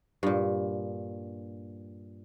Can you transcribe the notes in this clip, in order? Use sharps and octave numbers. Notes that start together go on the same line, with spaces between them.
G2 A#2